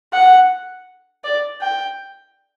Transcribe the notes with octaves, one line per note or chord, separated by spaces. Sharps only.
F#5
D5
G5